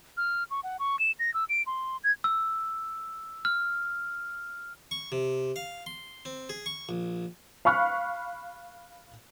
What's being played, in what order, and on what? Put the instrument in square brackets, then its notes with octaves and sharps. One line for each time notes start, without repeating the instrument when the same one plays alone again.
[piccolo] F6
C#6
F#5
C#6
E7
A#6
E6
D7
C6
G#6
[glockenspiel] E6
F6
[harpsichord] C#6
C3
F5
C6
C4
G#4
C#6
A#1
[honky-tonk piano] F5 B5 C#6 F6 F#6